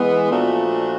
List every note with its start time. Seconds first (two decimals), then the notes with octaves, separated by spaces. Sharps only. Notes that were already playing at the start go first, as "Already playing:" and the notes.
Already playing: E3 G#3 B3
0.30 A#2 F3 A3 D4 F#4